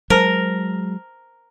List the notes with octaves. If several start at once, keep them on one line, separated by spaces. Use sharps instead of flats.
F#3 G#3 A#4 C5 A5